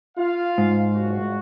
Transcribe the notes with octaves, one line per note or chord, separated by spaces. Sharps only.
F4 F5
G#2
F#1 F#4